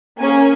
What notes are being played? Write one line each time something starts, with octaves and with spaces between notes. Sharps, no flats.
A#3 C#4 G#4 G#5